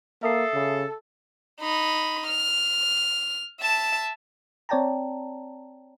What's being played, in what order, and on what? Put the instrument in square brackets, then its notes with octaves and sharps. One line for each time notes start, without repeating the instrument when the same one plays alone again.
[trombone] A#3 [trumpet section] A4 [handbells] E5 D#6 C7
[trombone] C#3
[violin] D#4 B5
F6
E5 A5
[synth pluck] C4 C#5 D5 G5 A5 A#5